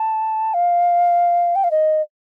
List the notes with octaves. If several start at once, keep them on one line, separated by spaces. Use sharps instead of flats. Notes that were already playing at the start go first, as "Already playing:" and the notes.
Already playing: A5
F5
G5
F5
D#5